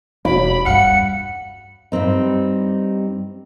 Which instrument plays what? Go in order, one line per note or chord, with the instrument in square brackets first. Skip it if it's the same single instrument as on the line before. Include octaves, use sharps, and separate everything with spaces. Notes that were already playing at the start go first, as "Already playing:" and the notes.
[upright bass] E1 [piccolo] B5 [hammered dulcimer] D6
[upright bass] E2 G2 [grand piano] F5 F#5 [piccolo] C#7
[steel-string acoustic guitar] G2 G3 C4 D#4